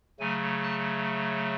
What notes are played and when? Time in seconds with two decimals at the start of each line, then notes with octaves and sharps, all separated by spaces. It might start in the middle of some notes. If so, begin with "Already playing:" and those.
0.20 C#3 F#3 A3 G#5
0.63 A5